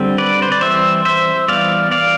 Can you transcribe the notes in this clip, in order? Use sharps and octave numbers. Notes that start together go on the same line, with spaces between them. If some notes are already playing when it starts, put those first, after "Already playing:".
Already playing: D3 G3 C4
B4 D5
C5
D5
E3 G3 C4 C5 E5
C5 E5
E3 G3 B3 D5 F5
D5 F5